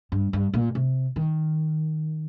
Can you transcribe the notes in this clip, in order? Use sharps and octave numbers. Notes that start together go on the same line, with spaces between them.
G2
G2
A#2
C3
D#3